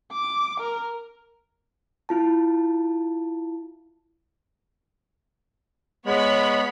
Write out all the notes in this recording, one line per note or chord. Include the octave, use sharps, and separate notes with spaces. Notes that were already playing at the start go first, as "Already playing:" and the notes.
D6
A#4
E4 F4 A5
G#3 B3 C#5 B5